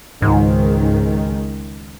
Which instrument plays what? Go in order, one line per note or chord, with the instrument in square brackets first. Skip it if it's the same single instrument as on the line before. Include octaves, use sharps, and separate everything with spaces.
[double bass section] C#2 D#3 G#3 [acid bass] G#2